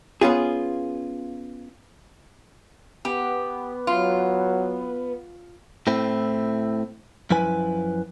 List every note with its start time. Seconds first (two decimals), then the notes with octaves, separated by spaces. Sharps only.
0.21 B3 C#4 F4 G#4
3.05 B3 G4
3.87 F#3 F4
5.87 A2 A3 C4 E4
7.31 F#2 F3 E4 B4 G#5